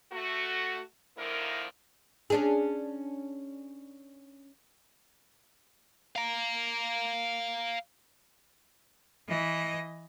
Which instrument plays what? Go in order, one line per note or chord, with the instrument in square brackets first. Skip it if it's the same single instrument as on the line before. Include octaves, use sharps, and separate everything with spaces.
[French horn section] A3 F#4
D3 D#3 F3 A#3 E4 A#4
[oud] C#4 D4 G#4
[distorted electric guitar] F5 A#5
[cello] E3 D#5